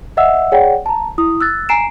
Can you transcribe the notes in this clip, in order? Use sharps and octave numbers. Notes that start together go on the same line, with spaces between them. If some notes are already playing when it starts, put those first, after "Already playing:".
D#5 E5 F#5 E6
G#4 C#5 D5 F#5 G5
A5 A#5
E4 D#6
E6 F#6 A6
G#5 A#5 C7 D7 E7